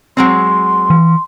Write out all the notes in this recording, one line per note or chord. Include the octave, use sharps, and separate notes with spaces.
F#3 G#3 C4 C6
E3